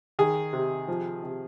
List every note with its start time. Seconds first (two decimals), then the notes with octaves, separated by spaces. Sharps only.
0.19 D#3 G#4
0.53 C3
0.88 F3
1.23 C3